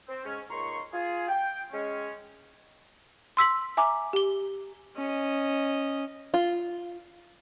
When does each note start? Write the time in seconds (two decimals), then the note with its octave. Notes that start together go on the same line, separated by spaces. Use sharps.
0.09 C4
0.25 G#2 C#4
0.50 C#2 A#2 D#4 A#5 C6 C#6
0.93 F4 G#4
1.28 G5
1.72 G#3 C#4
3.37 C6 E6 B6 F#7
3.77 E5 G#5 A#5 D6
4.13 G4 G7
4.96 C#4 D#5
6.34 F4